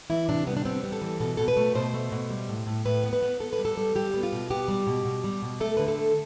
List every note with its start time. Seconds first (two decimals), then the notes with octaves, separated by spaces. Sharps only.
0.10 E3 E4
0.29 C3 D4
0.47 G3 B3
0.57 D4
0.65 B3 C4
0.84 G3
0.92 A4
1.02 E3
1.20 B2 A4
1.37 B2 A4
1.48 B4
1.57 A3
1.75 B2 C5
1.94 A3
2.12 B2
2.30 G3
2.49 A2
2.67 A2
2.85 A2 B4
3.04 B3
3.13 B4
3.22 B3
3.40 B3 A4
3.53 B4
3.58 G3
3.65 A4
3.77 G3
3.95 G3 G4
4.14 B3
4.23 F4
4.32 B2
4.50 B3 G4
4.68 G3
4.87 B2
5.05 B2
5.24 G3
5.42 B2
5.60 A3 A4
5.77 D3 B4
5.88 A4
5.98 A3